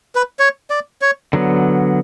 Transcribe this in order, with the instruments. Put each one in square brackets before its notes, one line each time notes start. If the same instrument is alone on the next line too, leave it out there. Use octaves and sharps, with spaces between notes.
[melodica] B4
C#5
D5
C#5
[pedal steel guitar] D3 F#3 B3